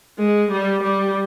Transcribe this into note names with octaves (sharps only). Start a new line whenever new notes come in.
G#3
G3
G3